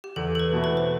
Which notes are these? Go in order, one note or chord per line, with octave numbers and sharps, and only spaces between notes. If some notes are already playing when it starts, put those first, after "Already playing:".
G4
E2 A4
A4
B4
B2 A3 E4
B4
C5